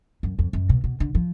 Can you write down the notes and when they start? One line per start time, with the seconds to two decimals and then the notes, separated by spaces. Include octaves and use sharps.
0.23 F#2
0.39 F2
0.53 F#2
0.69 B2
0.84 B2
1.00 D3
1.15 F3